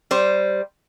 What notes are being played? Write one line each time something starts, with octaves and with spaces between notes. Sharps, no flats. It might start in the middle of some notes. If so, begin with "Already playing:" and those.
G3 C5